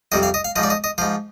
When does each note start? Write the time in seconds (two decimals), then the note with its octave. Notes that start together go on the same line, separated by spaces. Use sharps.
0.12 F2 C3 G3 D#5
0.23 F5
0.34 D#5
0.45 F5
0.56 F3 D#5
0.58 G#2 D5
0.70 D#5
0.84 D#5
0.98 F3 C5
1.02 G#2